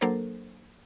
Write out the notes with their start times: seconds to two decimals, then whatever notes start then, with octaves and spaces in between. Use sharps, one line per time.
0.01 F#3 A#3 D4 A4 A#4 C5